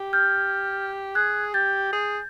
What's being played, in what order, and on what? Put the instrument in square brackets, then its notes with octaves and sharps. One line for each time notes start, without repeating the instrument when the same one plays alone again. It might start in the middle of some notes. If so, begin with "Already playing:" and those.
Already playing: [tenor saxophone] G4
[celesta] F6 G6
[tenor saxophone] G#4 [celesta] F#6 G#6
[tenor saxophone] G4 [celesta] G6 A6
[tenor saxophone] G#4